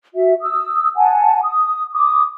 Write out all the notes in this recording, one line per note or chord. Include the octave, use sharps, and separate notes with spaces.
F#4 E5
D#6 E6
F#5 G#5 A5
D#6
D6 D#6